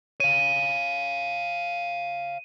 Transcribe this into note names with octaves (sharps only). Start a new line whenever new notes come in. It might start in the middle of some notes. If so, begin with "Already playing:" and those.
C#5 F5 D#7